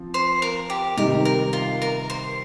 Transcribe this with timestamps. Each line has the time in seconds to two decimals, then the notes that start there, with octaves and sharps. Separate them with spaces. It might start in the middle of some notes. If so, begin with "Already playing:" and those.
Already playing: F3 C4
0.14 C5
0.42 A#4
0.70 G4
0.97 C3 D#3 G3 D#4 G4 A#4
1.25 A#4
1.53 F4
1.82 A#4
2.10 C5